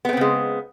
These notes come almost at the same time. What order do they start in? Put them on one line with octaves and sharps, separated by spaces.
B3 A3 C4 C#3 G#3